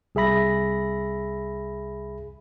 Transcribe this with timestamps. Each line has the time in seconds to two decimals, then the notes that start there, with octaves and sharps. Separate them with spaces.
0.15 C2 G#4 E5 B5 A#6